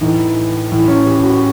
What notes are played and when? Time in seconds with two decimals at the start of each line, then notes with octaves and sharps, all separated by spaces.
0.01 A2 E3 D#4
0.72 A2 E3
0.88 C#4
1.06 G4
1.23 F#4